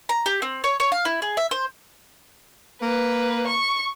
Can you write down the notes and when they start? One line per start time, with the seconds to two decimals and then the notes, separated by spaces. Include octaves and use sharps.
0.09 A#5
0.26 G4
0.42 C4
0.64 C#5
0.80 C#5
0.92 F5
1.05 E4
1.22 G#4
1.37 E5
1.51 C5
2.82 A#3 B4
3.47 C#6